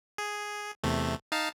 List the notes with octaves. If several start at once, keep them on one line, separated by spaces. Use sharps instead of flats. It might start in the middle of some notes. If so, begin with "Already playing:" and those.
G#4
E2 C3 A3
D#4 F5 A5